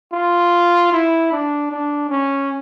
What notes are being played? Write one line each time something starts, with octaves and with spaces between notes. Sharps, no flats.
F4
E4
D4
D4
C#4